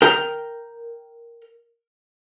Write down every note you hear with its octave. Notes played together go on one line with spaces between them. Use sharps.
A#4 G5